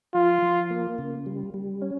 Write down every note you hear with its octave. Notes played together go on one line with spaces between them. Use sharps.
F3 F4
F3
A#3
C#3
G3
G3
C#4